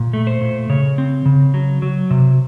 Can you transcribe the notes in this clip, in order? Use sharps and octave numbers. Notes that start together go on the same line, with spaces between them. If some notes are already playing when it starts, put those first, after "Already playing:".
Already playing: A#2
A3
C5
A#2
C#3 C#5
C4
C#3
F#3
F#3
C3